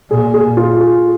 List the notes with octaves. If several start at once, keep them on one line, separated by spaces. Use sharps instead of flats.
A#2 G#4
G#4
F4
G#4